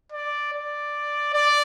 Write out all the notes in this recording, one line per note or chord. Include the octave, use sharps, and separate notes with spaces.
D5
D5
D5